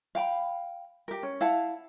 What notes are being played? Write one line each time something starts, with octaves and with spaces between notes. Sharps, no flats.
F5 G5 A5 B5
G4 A#4
C#4
E4 F5 F#5 A5